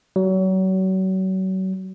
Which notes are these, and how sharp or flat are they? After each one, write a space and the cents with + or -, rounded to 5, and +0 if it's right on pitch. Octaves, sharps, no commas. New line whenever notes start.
F#3 +35